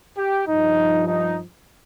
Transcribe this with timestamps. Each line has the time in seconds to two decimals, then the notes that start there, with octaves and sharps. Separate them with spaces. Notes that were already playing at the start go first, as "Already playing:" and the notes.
0.18 G4
0.47 G2 F3 D#4
1.07 D#4